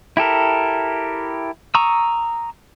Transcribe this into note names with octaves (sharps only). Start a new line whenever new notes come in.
E4 G4 A4 A#4
A#5 C#6 D#6 E6